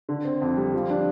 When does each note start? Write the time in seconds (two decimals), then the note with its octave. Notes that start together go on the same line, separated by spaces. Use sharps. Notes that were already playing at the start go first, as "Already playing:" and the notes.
0.09 D3
0.25 C4
0.42 F2
0.57 G3
0.74 F3
0.90 D4